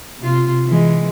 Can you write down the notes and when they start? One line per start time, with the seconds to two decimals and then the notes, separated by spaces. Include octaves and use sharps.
0.19 C3 F4
0.67 E3 G#3